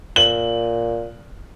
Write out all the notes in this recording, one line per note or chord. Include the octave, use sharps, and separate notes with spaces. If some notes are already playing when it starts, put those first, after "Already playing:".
A#2 F#7